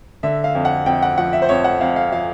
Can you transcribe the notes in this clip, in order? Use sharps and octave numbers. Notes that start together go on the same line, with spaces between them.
D3 E5
F5
F2
F#5
F2 G5
F#5
F3 F#5
E5
C5
F2 C#5
F#5
F2 F5
F5
F3 F5